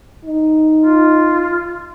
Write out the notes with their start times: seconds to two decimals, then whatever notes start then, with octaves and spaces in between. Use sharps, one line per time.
0.25 D#4
0.81 F4